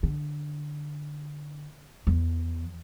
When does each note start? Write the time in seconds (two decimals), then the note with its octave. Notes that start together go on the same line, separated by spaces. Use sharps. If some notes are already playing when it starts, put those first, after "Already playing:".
0.03 D3
2.07 E2